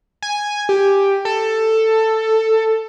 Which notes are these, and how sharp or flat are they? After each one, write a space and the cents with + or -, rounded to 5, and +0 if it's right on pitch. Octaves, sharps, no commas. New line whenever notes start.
G#5 -5
G4 +5
A4 +10